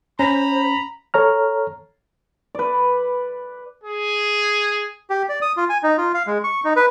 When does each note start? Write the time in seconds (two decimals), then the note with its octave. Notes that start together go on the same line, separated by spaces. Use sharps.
0.19 C#4 C5 A#5 B5
1.14 A4 C#5 A#5 F6
2.55 B4 D5
3.83 G#4
5.10 G4
5.29 D5
5.42 D#6
5.57 F4
5.69 G#5
5.83 D#4
5.98 F4
6.14 F5
6.27 G#3
6.44 C#6
6.64 D#4
6.76 B4